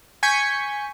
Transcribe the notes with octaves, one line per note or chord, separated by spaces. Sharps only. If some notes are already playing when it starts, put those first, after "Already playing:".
G#5 C#6 G6 B6 C#7